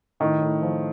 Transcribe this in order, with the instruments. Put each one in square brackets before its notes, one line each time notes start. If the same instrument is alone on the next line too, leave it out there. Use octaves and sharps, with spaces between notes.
[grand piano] A2 [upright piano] D#3
[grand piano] A2
F3